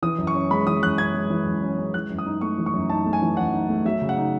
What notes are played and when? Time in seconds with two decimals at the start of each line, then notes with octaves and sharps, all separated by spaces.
0.02 E3 D#6
0.19 F#2
0.27 C#6
0.34 C#4
0.51 G#3 B5
0.66 E3 D#6
0.82 F#2 F#6
0.98 C#4 G#6
1.14 G#3
1.30 E3
1.46 F#2
1.62 C#4
1.78 G#3
1.94 E3 F#6
2.10 F#2
2.18 D#6
2.26 D#4
2.41 A3 C#6
2.58 E3
2.66 C#6
2.74 F#2
2.90 D#4 A5
3.06 A3
3.13 G#5
3.22 E3
3.37 F#2 F#5
3.53 D#4
3.69 A3
3.85 F#3 E5
4.02 C#3
4.09 F#5
4.17 D#4